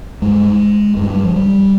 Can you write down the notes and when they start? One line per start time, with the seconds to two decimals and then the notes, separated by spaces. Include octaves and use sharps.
0.22 G2 G#3
0.97 G2 G#3
1.10 G3
1.24 F3
1.36 G3